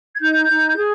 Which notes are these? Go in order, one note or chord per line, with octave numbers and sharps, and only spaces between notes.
G#6
D#4 G6
D#4
G#4